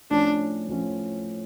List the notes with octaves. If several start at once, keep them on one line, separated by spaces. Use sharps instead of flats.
A2 F3 C#4 D4
A2 F3 C#4